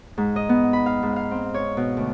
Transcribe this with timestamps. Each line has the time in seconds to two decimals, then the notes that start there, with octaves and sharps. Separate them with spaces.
0.18 G#2
0.36 D#5
0.49 B3
0.73 B5
0.86 F5
1.03 G#2
1.16 F5
1.31 C4
1.54 C#5
1.77 B2
1.97 D2